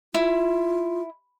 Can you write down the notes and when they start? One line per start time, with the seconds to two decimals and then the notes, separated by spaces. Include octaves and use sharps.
0.14 E4 F4